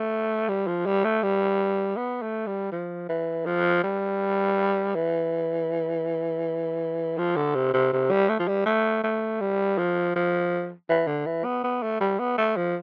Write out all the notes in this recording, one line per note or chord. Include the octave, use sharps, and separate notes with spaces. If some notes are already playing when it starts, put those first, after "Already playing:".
Already playing: A3
G3
F3
G3
A3
G3
B3
A3
G3
F3
E3
F3
G3
E3
F3
D3
C3
C3
C3
G3
A3
F3
G3
A3
A3
G3
F3
F3
E3
D3
E3
B3
B3
A3
G3
B3
A3
F3